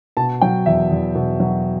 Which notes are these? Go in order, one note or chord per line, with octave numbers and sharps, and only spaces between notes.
B2 A5
F#3 G5
E2 E5
E2
B2
F#3